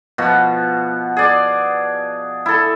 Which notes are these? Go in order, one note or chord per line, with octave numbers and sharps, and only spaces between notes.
B2 F3 F#4
G#4 D5
E4 A4